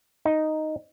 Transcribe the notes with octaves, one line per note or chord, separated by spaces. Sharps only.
D#4